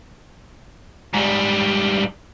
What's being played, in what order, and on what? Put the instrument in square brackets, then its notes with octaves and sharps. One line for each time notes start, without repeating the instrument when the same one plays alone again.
[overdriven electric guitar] G#2 G3